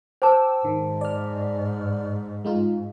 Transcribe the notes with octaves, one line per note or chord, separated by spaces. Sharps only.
C5 G5 A5 D6 E6
G#2 D#3
D5 F6
G#3 D#4 F4